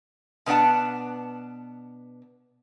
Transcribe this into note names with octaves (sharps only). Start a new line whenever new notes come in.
B2 B3 D4 F#5 A5